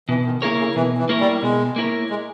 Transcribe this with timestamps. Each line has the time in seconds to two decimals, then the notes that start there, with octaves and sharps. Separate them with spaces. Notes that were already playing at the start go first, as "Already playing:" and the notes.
0.09 B2 E3
0.25 D#3
0.42 C#3 A#3 E4 A#4 C#5
0.59 C#3
0.75 B2 E3
0.98 E3
1.09 A#3 E4 A#4 C#5
1.20 G3
1.43 B2 G#3
1.76 A#3 E4 A#4 C#5
2.10 G#3